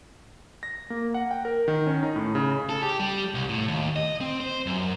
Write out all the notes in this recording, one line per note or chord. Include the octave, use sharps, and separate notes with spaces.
A#6
A#3
F#5
G5
A#4
D#3
C#4
D#4
A2
C#3
A4
G4
G3
C2
A2
D#2
D#5
C4
C5
F#2